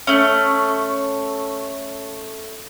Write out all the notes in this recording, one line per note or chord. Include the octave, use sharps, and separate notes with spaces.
A3 C#4